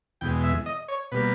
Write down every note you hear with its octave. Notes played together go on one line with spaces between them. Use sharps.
E2 B2 G#3 G5
E5
D#5
C#5
B2 G3 A#3 B4